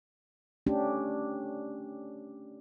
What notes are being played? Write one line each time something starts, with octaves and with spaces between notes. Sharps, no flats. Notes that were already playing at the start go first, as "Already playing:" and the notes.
A3 C#4 D4 G4